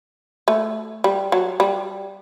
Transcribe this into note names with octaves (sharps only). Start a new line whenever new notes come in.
A3
G3
F#3
G3